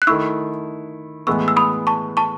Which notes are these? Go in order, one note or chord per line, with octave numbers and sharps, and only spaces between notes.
F#6
D#3 A3 E4 C#6 E6
A2 E3 G#3 B3 C#6 E6
E6
B5 D#6
A5 C#6
A5 C#6